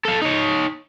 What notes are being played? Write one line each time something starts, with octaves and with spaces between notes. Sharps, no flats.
A4 F5
D#4 C#5